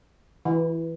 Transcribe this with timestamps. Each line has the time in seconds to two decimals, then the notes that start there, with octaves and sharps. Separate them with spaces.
0.45 E3